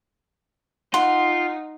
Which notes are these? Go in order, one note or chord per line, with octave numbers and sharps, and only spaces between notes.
D#4 F4 F#5 C6